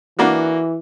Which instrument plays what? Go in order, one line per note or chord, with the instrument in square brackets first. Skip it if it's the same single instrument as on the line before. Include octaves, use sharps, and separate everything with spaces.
[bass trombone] E3 [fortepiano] A#3 D4 F#4